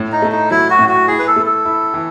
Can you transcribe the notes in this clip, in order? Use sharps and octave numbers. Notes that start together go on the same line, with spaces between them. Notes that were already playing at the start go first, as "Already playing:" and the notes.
Already playing: A2
D#4
A3
D#4
F#3 E4
F#4
A2
F#4
E4 G#4
B4
A4
A3
A4
E4
E3